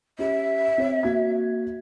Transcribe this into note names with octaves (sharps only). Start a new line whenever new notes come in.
C#4 G4 E5
C4 C#5
A#3 F#4 G#6